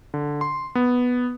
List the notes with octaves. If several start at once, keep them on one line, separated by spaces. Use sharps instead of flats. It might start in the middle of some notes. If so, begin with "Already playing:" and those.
D3
C6
B3